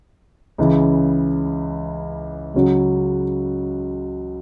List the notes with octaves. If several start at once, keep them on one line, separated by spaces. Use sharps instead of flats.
C#2 C#3 E3
C#2 C#3 F#3 C#4 F#4